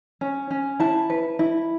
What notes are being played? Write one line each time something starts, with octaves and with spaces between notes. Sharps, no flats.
C#4
C#4
E4 A5
B4
E4